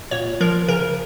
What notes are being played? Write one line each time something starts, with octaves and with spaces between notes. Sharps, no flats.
A#2 C#5
F3 A#4
C#3 A#4